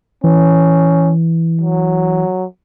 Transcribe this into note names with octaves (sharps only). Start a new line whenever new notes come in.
E3 C#4
F#3